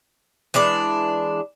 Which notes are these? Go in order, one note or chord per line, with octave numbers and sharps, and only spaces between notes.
E3 G#3 D4 D5